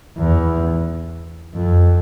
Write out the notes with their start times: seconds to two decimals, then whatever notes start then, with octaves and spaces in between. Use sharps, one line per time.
0.17 E2
1.55 F2